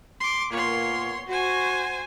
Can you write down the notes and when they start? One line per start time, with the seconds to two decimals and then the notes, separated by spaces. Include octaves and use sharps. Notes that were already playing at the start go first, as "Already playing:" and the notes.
0.20 C6 D6
0.52 A#2 A#3 B3 C#5 C6
1.28 F#4 C5 G#5